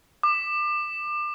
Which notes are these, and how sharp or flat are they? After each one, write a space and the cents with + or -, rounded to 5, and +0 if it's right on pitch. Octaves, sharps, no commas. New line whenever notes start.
D6 +30